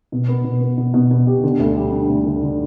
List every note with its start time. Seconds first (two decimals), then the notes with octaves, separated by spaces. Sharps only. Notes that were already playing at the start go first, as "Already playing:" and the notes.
0.12 B2
0.28 B3
0.44 B2
0.61 B3
0.78 B2
0.94 B2
1.11 B2
1.27 G4
1.44 D3
1.60 D2
1.76 G3
1.92 D4
2.09 D2
2.26 D3
2.43 D3